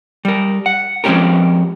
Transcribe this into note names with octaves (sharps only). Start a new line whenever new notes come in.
G3 A#4
F#5
F3 G#3 C4 C#4 G4 A#4